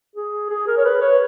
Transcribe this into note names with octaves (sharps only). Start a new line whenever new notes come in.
G#4
G#4
A#4
C#5
B4
C#5